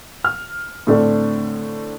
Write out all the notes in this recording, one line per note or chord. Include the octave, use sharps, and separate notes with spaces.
F6
A2 D3 A3 C4 D4 A4